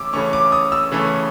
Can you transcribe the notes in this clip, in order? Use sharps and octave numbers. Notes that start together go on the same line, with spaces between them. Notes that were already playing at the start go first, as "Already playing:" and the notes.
Already playing: C#3 E3 A3 C#4 D6 E6
C#3 E3 A3 C#4 C#6
D6
D#6
E6
C#3 E3 A3 C#4